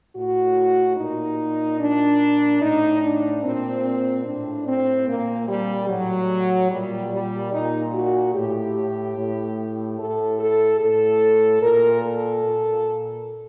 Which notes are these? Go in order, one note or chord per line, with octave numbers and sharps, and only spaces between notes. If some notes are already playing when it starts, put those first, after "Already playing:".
A2 F#4
A#2 D#4
A#2 D4
A2 D#4
D4
A#2 C4
A2 D4
C4
A#2 A#3
G3
A2 F#3
A#2 G3
G3
A#2 D#4
F#4
A2 G4
A2
A2 A4
A4
A2 A4
A#2 A#4
A4
A#2